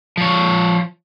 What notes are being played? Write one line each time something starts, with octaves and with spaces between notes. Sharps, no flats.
F3 C#5